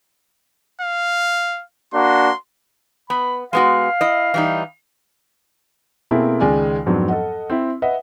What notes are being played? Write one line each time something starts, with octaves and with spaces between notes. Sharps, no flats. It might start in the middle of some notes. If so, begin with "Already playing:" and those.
F5
A#3 D4 F#4 C6
B3 B5
G#3 B3 F#4 F5
E4 D#5
E3 G3 D#4
B2 A#3 C4 E4 G#4 A4
C#2 D#3 G#3 D5 G#5 F6
F2 G#2 F#3 B3 C4 D4
A4 D#5 F#5
C4 E4
B4 D#5 E5 F#5